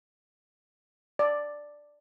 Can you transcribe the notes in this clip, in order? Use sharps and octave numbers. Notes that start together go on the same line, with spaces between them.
D5